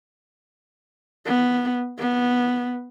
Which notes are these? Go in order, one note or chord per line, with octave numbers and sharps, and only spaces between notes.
B3
B3